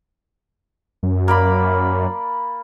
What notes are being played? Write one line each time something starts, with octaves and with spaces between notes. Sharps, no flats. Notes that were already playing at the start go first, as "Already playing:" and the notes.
F#2
A#3 D5 B5